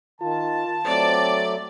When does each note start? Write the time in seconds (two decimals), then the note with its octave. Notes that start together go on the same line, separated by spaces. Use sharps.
0.21 D#3 F4 A5
0.87 F#3 A3 C4 D5